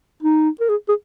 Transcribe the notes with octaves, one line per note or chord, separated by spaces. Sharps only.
D#4
A#4
G#4
G#4